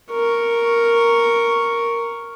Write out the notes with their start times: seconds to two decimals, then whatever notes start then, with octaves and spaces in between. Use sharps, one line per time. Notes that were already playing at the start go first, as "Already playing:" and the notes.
0.11 A#4 C#6